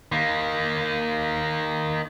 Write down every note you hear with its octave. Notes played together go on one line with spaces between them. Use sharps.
D#3 A#3